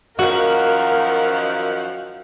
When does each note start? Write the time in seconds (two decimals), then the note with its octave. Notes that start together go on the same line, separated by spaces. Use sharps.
0.19 F#2 D#3 F3 F#4 A#4 F#5